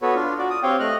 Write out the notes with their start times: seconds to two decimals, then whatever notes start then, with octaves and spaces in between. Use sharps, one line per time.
0.02 B3 F#4 A4 B4 C#5
0.15 D4 F4
0.38 F#4 D5
0.50 D#6
0.63 C4 G4 C#5 F5 G5
0.80 A3 D#5 F6 F#6